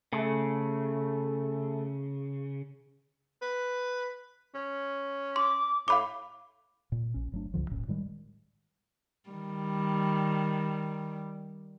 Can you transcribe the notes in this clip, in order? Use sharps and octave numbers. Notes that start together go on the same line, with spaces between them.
C#3 A3
B4
C#4
C6 D6
A2 F5 B5 D6
A#2
A#1 C#4
G1 F#3 A3 D4
C#2 G2 D3 F3
D1 A#1 A2 C#4
A2 D#3 G3 G#3
D#3 G3